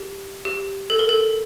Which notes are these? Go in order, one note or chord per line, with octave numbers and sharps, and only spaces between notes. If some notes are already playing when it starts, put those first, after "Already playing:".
Already playing: G4
G4
A4
A#4
A4